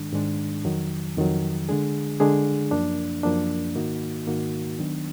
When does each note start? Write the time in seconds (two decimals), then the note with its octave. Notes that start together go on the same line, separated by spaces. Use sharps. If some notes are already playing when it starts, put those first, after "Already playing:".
Already playing: G#2 D#3 G#3 D4
0.13 G#2 D#3 G#3 D4
0.64 F2 D#3 F#3
1.17 F2 D#3 F#3
1.69 D3 G#3 D4 G#4
2.20 D3 G#3 D4 G#4
2.71 F#2 F3 A#3 D4
3.23 F#2 F3 A#3 D4
3.75 G#2 D#3 A#3 D#4 F#4
4.27 G#2 D#3 A#3 D#4 F#4
4.79 D#3 F#3 B3 D4